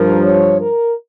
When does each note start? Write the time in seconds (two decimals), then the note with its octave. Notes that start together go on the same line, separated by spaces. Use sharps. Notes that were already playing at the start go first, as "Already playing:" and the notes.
Already playing: G2 F3 A#4
0.24 C#5
0.61 A#4